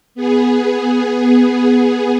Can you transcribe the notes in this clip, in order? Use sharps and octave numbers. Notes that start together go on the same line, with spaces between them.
B3 G#4